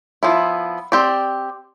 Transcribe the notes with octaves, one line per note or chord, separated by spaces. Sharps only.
F3 B3 E4
C4 G4 D5